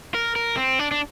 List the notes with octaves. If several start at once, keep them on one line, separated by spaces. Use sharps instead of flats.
A#4
A#4
C4
D4
D4